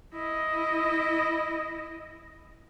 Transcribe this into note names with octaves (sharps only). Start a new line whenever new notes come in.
E4 D#5